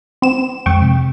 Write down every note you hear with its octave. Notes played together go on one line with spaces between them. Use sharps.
C4 E7
F2 G#3 G5 C#6
C3